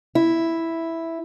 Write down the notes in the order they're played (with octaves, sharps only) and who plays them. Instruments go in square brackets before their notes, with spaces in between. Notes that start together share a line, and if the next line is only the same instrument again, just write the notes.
[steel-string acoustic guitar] E4